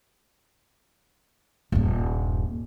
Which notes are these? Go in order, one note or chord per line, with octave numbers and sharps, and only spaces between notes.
D#1 G2